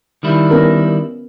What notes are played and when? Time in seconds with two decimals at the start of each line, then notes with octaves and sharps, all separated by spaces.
0.23 D#3 G3 E4
0.51 B3 C#4 A#4